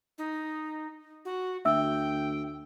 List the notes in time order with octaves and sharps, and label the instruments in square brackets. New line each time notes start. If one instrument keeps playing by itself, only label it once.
[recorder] D#4
F#4
[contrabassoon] D2 [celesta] E5 E6 [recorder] G5